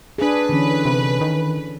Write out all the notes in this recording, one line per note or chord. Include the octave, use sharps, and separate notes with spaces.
D4 G#4 B4
D3 E3 C#4
C3
D#3